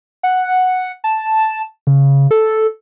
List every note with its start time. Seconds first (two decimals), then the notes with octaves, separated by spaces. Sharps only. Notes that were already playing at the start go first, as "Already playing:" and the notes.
0.23 F#5
1.04 A5
1.87 C#3
2.31 A4